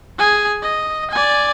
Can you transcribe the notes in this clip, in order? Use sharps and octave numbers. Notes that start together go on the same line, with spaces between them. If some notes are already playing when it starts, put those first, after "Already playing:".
G#4 G#5
D#5
D5 G#5